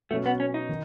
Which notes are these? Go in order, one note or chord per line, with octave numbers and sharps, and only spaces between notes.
B2 F#3 A3 C#4
B3
C#4
D#4
D#3